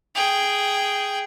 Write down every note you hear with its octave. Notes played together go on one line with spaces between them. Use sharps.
G#4 G5